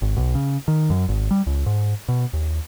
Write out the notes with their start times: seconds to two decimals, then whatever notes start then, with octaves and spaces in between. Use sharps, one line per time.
0.02 G#1
0.17 B1
0.35 C#3
0.68 D#3
0.90 F#2
1.09 G#1
1.31 G3
1.47 C#2
1.66 G#2
2.08 B2
2.33 D#2